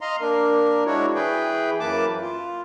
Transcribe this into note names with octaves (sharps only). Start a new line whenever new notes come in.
D#5 F5 A#5 C6
A#3 D4 A#4
G#3 D4 E4 F#4 C#5
E3 G#4 B4 G5
F#2 E3 A#3 B4 A5 D6
F4